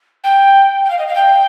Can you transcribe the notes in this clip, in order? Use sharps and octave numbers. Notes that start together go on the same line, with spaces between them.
G5
G5
F5
D#5
F5
G5